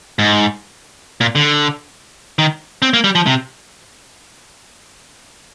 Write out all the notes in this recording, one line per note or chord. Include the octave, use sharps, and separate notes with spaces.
G#2
A#2
D3
D#3
C4
A#3
G3
F3
C3